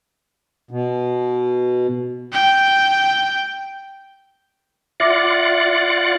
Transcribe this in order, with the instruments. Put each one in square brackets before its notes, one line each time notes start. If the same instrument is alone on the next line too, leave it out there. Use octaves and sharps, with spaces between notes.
[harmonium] B2
[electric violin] G5
[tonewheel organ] F4 D5 F#5 [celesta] E5 D6 A#6